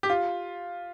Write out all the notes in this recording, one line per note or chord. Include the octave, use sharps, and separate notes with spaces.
G4
F4